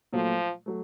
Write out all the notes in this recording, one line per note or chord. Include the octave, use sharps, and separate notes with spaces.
A#2 F3 F#3 A3
F#3 A3